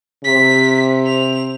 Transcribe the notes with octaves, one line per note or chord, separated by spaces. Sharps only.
C3 B6
C4 F7